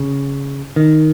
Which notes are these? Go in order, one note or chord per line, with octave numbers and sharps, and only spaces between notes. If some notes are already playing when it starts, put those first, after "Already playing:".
Already playing: C#3
D#3